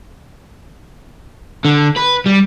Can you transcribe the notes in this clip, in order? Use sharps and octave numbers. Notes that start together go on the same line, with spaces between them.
D3
B4
G3